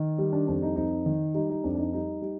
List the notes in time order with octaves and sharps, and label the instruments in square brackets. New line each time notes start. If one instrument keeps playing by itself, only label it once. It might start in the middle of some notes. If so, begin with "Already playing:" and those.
Already playing: [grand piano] D#3
G3
D4
F2 D4
D#4
F2 D#4
D#3
G3 D#4
D#4
F2 D4
D4
D#4
G3 D#4
G3